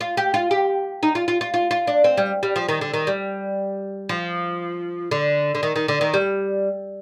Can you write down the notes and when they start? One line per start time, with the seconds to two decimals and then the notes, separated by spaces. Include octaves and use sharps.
0.01 F4
0.17 G4
0.34 F4
0.51 G4
1.03 D#4
1.15 F4
1.28 F4
1.41 F4
1.54 F4
1.71 F4
1.87 D4
2.04 C4
2.17 G3
2.43 G3
2.56 F3
2.69 D#3
2.81 D3
2.94 D#3
3.07 G3
4.09 F3
5.11 D3
5.55 D3
5.63 D#3
5.76 D#3
5.88 D3
6.01 D#3
6.14 G3